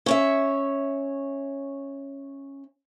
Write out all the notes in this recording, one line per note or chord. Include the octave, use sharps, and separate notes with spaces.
C#4 C#5 E5